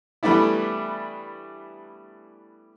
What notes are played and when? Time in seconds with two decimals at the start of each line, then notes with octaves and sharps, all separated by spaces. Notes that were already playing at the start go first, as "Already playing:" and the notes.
0.23 E3 G3 A3 B3 D4 E4